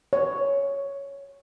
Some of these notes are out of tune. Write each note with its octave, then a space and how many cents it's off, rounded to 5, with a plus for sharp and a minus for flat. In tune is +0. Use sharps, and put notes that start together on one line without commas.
C#5 +5